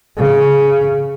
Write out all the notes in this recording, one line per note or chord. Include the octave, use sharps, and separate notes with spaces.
C#3